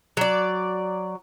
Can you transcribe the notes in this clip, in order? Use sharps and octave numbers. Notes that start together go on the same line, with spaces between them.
F#3 D5